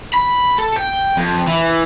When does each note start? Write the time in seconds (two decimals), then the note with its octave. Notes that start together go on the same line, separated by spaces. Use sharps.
0.14 B5
0.58 A4
0.76 G5
1.18 F2
1.48 E3